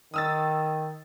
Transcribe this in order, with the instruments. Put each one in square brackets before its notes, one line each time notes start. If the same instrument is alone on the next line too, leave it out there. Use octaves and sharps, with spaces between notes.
[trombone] D#3 [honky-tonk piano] D#6 E6 A6